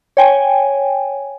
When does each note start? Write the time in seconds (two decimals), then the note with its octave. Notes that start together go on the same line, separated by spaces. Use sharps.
0.17 C#5 G5 G#5